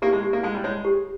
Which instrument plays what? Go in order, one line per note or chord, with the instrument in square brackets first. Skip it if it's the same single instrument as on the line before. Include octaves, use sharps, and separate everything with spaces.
[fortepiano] A#3 [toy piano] G4
[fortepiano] G#3
[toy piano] G4
[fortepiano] A#3
[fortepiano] G#3 [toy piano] F5
[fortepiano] G3
[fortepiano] G#3 [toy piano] C#5
[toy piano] G4